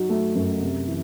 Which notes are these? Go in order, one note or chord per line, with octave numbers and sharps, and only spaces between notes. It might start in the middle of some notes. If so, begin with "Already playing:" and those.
Already playing: F#3 D#4
A3
F#2
C3
E3